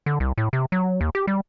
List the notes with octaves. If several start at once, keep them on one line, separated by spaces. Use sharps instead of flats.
D3
C2
A2
C3
F#3
D#2
G4
G3